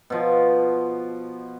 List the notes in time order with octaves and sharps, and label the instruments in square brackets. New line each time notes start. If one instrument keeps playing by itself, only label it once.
[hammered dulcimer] B2 F3